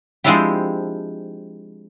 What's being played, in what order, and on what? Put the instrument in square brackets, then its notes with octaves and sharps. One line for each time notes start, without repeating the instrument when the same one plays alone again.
[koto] F3 G#3 C4 D4 E4 G4